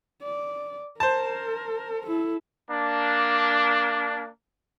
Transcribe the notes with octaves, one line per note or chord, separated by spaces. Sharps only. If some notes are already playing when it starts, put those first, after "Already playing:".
D5
A#4 C5 A5
E4 A4
A#3 D4